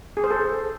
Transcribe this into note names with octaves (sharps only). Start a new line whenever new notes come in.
G#4
C5
A4